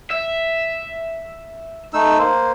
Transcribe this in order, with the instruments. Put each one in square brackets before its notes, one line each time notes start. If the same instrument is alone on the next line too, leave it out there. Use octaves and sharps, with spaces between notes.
[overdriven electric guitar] E5
[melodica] A3 D#4 E6
A#3 C5